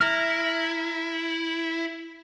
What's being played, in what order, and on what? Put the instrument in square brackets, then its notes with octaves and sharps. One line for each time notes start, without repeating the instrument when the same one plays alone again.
[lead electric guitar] E4 [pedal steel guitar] A#5 F6